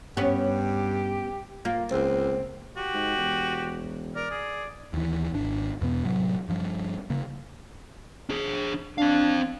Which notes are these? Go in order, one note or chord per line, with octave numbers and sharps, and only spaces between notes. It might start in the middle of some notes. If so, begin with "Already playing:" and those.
G2 B3 C#4 G4
A#3 F4
C#2 C4
F#4 G4
G#2
E1
A#4 D5
G#4
D#2 E3
G#1 D4
E2 B2 B3
A2 C3 F#3
G2 F3
C#3 A#3
D4 G#4
C4 D4 F5